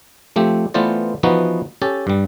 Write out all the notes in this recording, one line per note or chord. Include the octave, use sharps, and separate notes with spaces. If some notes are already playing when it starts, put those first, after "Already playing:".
F3 A3 C4 G4
E3 A3 B3 F4 C5 D5
E3 F3 B3 D#4 F#4
C#4 G4 A4 A5
G2 G3